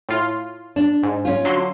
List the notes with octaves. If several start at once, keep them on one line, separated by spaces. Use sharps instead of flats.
A2 F4
D4
G#2
C#4 F4
D3 F#3 C6